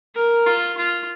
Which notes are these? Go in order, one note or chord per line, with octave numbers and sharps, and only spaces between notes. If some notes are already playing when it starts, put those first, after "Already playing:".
A#4
F4
F4